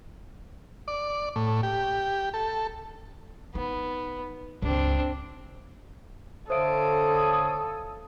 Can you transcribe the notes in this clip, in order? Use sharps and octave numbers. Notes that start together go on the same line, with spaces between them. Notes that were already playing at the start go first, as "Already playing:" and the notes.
D5
A2
G4
A4
B3 D#4
C#2 G2 C4 D4
D3 A4 C5 C#5 E5 F5 D#6 D7